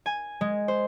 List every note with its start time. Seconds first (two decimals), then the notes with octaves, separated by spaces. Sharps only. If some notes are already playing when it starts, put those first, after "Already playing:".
0.06 G#5
0.41 G#3
0.68 C5